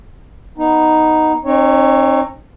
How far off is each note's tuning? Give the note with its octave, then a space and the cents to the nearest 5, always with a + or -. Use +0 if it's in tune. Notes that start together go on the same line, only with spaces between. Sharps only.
B3 +0 D#4 +0
C4 +35 D#4 -35 C#5 +0